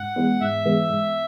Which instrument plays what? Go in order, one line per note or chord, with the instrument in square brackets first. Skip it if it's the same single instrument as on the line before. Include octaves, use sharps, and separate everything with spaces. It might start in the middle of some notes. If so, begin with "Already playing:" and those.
Already playing: [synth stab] G#2 [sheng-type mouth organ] F#5
[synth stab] E3 G#3 B3
[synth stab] G#2 [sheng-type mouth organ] E5
[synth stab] E3 G#3 B3
G#2